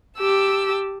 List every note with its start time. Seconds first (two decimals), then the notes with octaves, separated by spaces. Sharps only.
0.18 G4 A5 E6